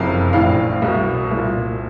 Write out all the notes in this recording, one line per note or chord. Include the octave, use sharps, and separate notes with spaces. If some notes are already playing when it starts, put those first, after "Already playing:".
Already playing: F#1 F2 C3 F5
A#1 A2 E3 F5
C2 B2
C2 A#2